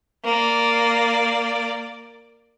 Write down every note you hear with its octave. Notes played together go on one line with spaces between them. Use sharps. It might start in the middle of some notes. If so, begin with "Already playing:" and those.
A#3 D5